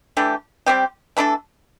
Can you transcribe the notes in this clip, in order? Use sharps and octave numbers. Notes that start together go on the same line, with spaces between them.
E3 A3 D4 G4
G3 C4 G4
E3 A3 D4 A4